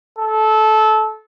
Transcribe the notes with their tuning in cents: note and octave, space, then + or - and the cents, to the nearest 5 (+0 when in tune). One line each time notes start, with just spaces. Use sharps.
A4 -20